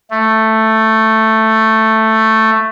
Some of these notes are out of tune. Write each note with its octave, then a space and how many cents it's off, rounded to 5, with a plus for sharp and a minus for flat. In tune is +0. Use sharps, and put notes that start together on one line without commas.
A3 +5